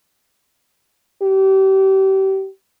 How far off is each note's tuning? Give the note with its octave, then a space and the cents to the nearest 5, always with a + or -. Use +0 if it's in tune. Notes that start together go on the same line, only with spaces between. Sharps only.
G4 -30